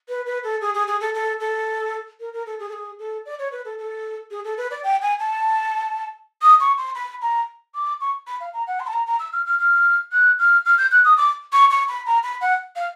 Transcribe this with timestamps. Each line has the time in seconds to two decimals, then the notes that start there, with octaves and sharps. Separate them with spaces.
0.09 B4
0.26 B4
0.44 A4
0.61 G#4
0.74 G#4
0.87 G#4
1.01 A4
1.14 A4
1.40 A4
2.20 A#4
2.33 A#4
2.46 A4
2.59 G#4
2.69 A4
2.73 G#4
2.99 A4
3.26 D5
3.39 C#5
3.52 B4
3.65 A4
3.78 A4
4.31 G#4
4.45 A4
4.57 B4
4.71 D5
4.84 G5
5.02 G#5
5.19 A5
6.42 D#6
6.60 C#6
6.78 C6
6.95 B5
7.22 A#5
7.75 D6
8.01 C#6
8.27 B5
8.40 F5
8.54 A#5
8.67 F#5
8.80 C6
8.87 A5
8.93 A#5
9.07 A#5
9.20 E6
9.33 F6
9.46 F6
9.59 F6
10.12 F#6
10.39 F6
10.65 F6
10.78 G6
10.92 F#6
11.05 D#6
11.18 D6
11.53 C#6
11.71 C#6
11.89 B5
12.06 A#5
12.23 B5
12.41 F#5
12.76 F5